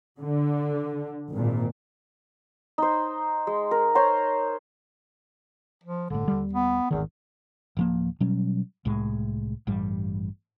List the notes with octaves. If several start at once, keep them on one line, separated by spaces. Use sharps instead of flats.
D3
G#1 A#2
D#4 C5
G#3
A#4
C5 C#5 A#5 C6
F3
G1 A2 D3
D#1 G3
B3
G#1 E2 D#3
D1 F3 A#3
B2 F#3 G3 C#4
C2 A2 G#3
A1 G2 G3